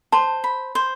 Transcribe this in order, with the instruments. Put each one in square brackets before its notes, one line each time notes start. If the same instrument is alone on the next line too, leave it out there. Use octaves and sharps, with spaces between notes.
[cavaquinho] C5 [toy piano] A5
[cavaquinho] B5
C5